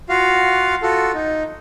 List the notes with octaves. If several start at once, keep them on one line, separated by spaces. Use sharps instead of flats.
F4 F#4 F5
F4 F#4 A4
D#4